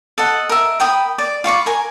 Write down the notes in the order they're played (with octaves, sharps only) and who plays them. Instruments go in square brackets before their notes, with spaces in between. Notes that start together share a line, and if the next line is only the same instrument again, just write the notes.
[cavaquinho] A4 D#5 F#5
A#4 E5
A#4 G5 B5 D#6
D5
F4 B5 C#6 D6
A#4 G#5